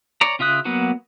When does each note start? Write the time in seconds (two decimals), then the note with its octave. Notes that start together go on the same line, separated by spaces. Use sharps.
0.21 C#5 D5 A#5
0.39 C#3 F4 E5 D#6 F#6
0.65 F#3 A#3 B3 F#4